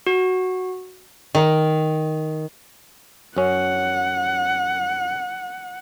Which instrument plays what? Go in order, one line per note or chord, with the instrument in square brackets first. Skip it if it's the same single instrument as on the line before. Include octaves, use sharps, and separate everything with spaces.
[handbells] F#4
[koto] D#3
[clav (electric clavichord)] F#2 C#4 [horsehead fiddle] F#5